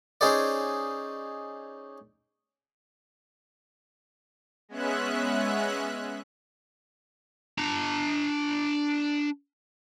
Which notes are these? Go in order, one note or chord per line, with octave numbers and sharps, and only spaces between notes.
C#4 D#4 G#4 C5 D5
G#3 B3 C#4 E5 F#6
D4 A#5